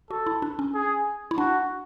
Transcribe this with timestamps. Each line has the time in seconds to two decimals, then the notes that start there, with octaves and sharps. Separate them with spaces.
0.10 F#4 A4
0.27 E4
0.42 D4
0.59 C#4
0.74 G#4
1.31 E4
1.38 D4 F#4